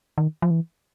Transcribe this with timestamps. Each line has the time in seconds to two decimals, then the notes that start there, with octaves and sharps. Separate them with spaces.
0.18 D#3
0.42 F3
0.51 E3